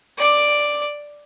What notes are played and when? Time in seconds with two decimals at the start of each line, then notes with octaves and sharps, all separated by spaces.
0.17 D5 D6